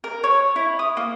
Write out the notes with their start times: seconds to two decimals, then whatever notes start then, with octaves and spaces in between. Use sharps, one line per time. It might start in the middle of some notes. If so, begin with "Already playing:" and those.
0.04 A#4
0.24 C#5
0.56 E4
0.79 D#6
0.97 A#3